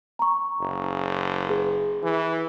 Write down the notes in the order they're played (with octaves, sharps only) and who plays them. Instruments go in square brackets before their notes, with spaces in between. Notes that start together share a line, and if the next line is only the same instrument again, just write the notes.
[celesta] A#5 C#6
[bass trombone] F#1
[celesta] G#4 B4
[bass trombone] E3